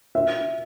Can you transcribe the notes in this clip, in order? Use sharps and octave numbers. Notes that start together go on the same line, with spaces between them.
E5